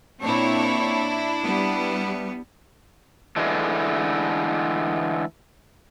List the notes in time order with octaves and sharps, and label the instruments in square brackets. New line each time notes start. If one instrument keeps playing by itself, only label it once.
[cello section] A#2 C4 C#5 [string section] D4 E4
[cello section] G3 B3
[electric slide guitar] D3 E3 G#3 A3